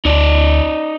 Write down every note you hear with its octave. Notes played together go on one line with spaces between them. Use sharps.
D2 D#4 D5